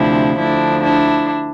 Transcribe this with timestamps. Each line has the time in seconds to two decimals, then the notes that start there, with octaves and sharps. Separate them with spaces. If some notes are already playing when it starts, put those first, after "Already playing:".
Already playing: D2 C3 F3 D4 E4
0.38 D2 D3 F3 D4 E4
0.83 D4 E4